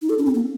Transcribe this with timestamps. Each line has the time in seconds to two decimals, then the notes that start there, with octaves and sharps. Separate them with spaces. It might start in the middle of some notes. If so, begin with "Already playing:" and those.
0.02 D#4
0.10 A4
0.18 C#4
0.26 C4
0.34 A#3